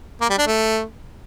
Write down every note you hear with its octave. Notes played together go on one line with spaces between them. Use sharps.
A#3
G3
D4
A3